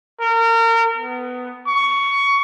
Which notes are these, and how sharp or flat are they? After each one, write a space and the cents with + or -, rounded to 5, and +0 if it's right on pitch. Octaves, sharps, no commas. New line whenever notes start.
A#4 -30
B3 +15
C#6 +15